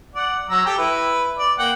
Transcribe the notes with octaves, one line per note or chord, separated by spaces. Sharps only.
D5 F#5
F#3 A#5 E6
G4 A4 G5
E4 B4
D5
A#3 F#5 G5